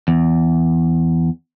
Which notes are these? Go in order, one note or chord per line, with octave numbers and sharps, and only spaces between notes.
E2